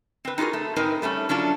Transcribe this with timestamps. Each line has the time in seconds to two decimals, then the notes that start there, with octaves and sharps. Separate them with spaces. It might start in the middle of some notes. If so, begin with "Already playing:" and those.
0.25 C4 B4
0.38 D#4 F4 F#4 G#4 A#4
0.53 A3
0.76 G#2 C4 D#4 A#4 B4
1.02 G3 A3 B3 C#4
1.29 F#3 C#4 D4 F4